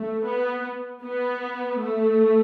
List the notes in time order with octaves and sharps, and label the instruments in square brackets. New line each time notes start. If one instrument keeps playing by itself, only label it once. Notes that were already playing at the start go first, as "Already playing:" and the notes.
Already playing: [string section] A3
B3
B3
A3